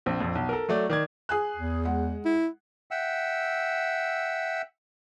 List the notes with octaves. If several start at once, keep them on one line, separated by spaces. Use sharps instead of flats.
A#1 C4
A#1 F2
B1
A4 A#4
F#3 A3 D5
D#3 D5 G#6
G#4 G#5 F#6
E2
G#3 F#5
E4
E5 F#5 G5 E6